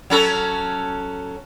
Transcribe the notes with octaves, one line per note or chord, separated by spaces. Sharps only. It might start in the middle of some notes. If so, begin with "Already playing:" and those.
F#3 C#4 A4